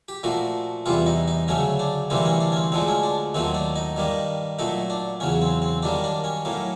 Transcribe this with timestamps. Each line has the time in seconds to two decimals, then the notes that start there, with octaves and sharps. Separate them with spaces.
0.08 G4
0.23 A#2 F3 A3 F#4
0.86 E2 C3 E3 G3 F4
1.06 D#4
1.28 D#4
1.48 D2 C#3 F#3 A3 C#4
1.79 D4
2.10 D2 C3 E3 G3 A#3 C4
2.25 C#4
2.41 D4
2.52 C#4
2.56 C4
2.72 D2 D3 F3 G#3 C4
2.88 C#4
3.03 D4
3.34 D#2 D#3 F#3 A3 C4
3.55 D4
3.76 D#4
3.97 G2 D#3 G3 A#3
4.59 A#2 F#3 A3 D#4
4.90 D4
5.20 E2 C#3 F#3 C#4
5.42 C4
5.62 C4
5.83 F#2 D#3 G3 A#3 D4
6.04 D4
6.24 C#4
6.45 A2 F#3 A#3